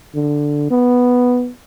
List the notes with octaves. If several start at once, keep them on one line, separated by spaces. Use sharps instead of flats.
D3
B3